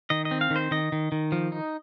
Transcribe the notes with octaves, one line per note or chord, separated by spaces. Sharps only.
D#3 D#5
D#5
C4
F5
D#3
C5
D#3 D#5
D#3
D#3
F3
D#4